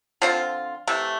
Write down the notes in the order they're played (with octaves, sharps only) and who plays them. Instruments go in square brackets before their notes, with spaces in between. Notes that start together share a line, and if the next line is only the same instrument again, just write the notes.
[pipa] D3 F3 C4 F4
C3 E3 A3